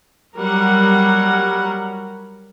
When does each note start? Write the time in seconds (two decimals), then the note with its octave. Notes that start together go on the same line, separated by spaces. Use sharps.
0.37 F#3 G3 A#4 F#5